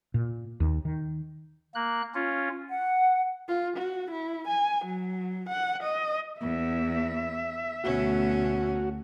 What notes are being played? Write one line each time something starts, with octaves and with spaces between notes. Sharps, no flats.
A#2
D#2
D#3
A#3 F#6
C#4 F4
F#5
F4
F#4
E4
G#5
F#3
F#5
D#5
E2 E5
D2 B2 A3 C#4 F#4